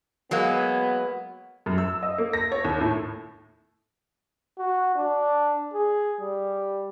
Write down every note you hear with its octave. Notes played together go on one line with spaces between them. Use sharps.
F#3 G#3 A#3 B3
F#2
E6
D#5
A#3
A#6
C#5
D#2
A2
F#4
D4
G#4
G3